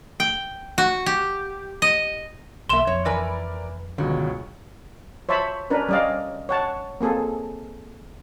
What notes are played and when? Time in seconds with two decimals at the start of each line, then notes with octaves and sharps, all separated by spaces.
0.20 G5
0.78 F#4
1.06 G4
1.82 D#5
2.69 B1 E2 A#3 E5 C6 E7
2.87 F2 C#5
3.05 E3 A#4 B4 D5 G#5
3.98 C#2 G2 B2 D3 D#3 F#3
5.29 C5 C#5 E5 A5 B5
5.70 C#4 D4 A#4 B4
5.89 G3 C#4 D5 D#5 F5
6.49 C#5 F#5 A5
7.01 A#3 C4 G#4 A4